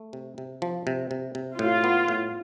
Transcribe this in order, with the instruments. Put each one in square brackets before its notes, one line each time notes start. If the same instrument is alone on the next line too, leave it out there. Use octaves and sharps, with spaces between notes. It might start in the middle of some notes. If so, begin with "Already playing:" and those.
Already playing: [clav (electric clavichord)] A3
C3
C3
F3
C3
C3
C3
[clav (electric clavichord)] A2 [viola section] F4
[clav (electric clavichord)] B3
A2